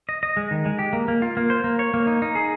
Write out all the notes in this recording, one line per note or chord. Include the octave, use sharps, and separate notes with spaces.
D#5
D#5
G#3
D#3
G#3
G4
A#3
A#3
F4
A#3
C5
A#3
C#5
A#3
D#4
D#4
G#4